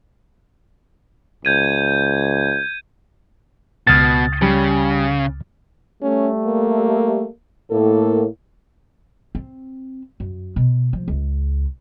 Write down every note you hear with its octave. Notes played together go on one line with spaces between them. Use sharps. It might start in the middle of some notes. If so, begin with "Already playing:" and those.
C#2 G6 G#6 D#7
C#2 B2 D#6 F6 G#6 A6
C#3 G3
G3 A3 C#4
A#3
A2 A#3 A4
C4
F#2
B2
F3
C#2 C#3